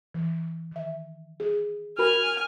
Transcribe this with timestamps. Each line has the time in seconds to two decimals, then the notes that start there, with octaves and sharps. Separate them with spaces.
0.14 E3
0.72 D#3 E5
1.40 G#4
1.99 F#4 A#4 G#5 B5 F6